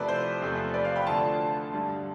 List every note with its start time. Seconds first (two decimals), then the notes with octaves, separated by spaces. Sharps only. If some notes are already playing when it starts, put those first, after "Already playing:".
Already playing: F2 C3 F3 A3 E4 B4 D5
0.08 C5
0.42 E2 C3 F3 A3
0.74 B4 D5
0.85 D5 F5
0.96 G5 B5
1.07 D2 D3 A3 D4 F4 A5 C6
1.73 G2 D3 G3